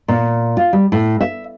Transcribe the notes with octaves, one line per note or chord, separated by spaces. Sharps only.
A#2
F4
G3
A2
E5